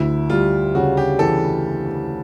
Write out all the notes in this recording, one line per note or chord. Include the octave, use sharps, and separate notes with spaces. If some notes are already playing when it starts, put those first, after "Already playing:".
Already playing: D2 E4
G3 F4
C#3 F#4
G4
E3 A4